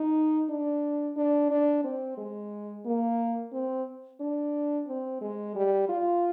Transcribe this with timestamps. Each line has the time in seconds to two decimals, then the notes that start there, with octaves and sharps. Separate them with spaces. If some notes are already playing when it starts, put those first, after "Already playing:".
Already playing: D#4
0.49 D4
1.17 D4
1.50 D4
1.84 C4
2.18 G#3
2.85 A#3
3.53 C4
4.20 D4
4.88 C4
5.21 G#3
5.55 G3
5.89 F4